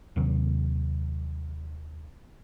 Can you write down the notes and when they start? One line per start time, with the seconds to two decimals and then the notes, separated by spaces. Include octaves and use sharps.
0.16 D#2 C3 D#3 F#3